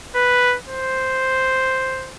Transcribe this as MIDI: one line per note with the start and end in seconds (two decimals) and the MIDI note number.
0.15 0.56 71
0.68 2.14 72